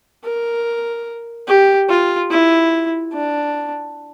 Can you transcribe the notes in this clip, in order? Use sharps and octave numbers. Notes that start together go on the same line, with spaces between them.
A#4
G4
F4
E4
D4